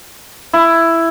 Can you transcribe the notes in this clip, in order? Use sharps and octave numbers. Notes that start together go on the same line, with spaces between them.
E4